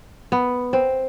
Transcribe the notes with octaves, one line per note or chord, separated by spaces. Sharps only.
B3
C4